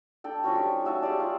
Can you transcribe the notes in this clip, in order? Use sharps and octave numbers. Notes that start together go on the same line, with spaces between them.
D4 A4 G5
F3 F#3 C#4 F#4
G3 D#4
F#4 E5 G#5 A5
G#3 G4 G#4 D5
F4